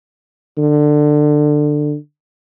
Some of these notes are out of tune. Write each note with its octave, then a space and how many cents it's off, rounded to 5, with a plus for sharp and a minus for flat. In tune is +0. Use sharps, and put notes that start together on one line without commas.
D3 +20